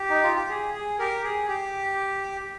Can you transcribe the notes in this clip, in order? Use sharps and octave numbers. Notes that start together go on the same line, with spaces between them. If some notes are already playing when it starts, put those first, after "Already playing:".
Already playing: G4
D#4
F4
G4
G#4
G#4
G4 A#4
G#4
G4